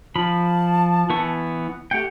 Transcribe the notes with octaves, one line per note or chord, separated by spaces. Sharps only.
F3 A5 B5
E3 B3 C#6
A3 G4 F#5 G5